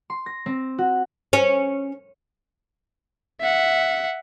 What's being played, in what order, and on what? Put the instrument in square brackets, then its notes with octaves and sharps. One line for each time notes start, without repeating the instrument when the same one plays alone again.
[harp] C6
A#6
C4
F#4
[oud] C#4
[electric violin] E5 F#5